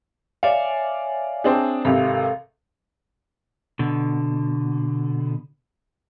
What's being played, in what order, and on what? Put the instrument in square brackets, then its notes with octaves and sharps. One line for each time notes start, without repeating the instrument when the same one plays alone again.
[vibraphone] C#5 E5 G#5 [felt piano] D5 F5
[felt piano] C4 D4 G#4
[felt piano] G#1 C3 [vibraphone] A4 F5
[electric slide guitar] B2 D3